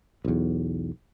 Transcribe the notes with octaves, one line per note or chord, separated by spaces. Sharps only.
B1 E2